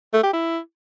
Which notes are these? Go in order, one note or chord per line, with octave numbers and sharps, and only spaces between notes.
A3
G4
E4